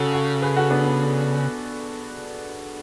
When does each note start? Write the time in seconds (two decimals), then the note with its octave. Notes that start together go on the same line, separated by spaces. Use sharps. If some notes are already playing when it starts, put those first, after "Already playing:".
Already playing: C#3 F#4 A4
0.13 F#4 A4
0.42 G#4 B4
0.56 F#4 A4
0.70 B3 D4
0.85 B3